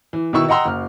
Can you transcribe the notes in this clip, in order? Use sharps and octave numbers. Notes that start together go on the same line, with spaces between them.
E3
B2 D#3 E4 C#6 E6
D#5 F#5 G5 A#5 C6 E6
F#1 F6